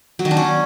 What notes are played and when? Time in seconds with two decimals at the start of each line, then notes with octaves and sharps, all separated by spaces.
0.19 F#3
0.25 D#3
0.31 D4
0.37 C#4